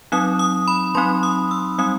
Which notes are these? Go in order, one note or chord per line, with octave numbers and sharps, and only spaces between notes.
F#3 C4 D#4 D#6
D#6
B5
F#3 C4 D#4 C6
D#6
E6
G3 C4 D#4 D#6